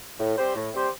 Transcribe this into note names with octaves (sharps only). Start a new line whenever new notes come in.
A2
G3 C4 G4 C5
A2
G3 C4 G4 C5